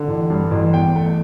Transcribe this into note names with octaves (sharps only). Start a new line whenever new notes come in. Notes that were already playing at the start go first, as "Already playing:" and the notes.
Already playing: D3
A1
G2
A1
E2 G5
A3